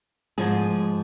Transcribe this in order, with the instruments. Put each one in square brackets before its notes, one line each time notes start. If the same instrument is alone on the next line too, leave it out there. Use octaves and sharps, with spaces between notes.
[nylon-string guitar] G#2 F3 G#3 G#4